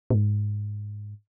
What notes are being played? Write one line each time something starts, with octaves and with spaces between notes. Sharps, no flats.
A#2
G#2